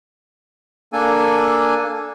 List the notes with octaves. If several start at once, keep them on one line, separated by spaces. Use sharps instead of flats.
A#3 D4 A4 G#5